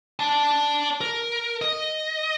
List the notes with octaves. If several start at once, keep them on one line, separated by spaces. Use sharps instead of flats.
D5 A5
A#4
D#5